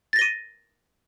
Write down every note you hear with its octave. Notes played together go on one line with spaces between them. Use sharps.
A6 A#6 D#7 G7